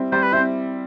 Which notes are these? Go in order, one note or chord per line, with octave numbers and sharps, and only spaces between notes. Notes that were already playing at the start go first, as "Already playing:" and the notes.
Already playing: G3 C4 E4
G3 C5
B4
C4 E4 C5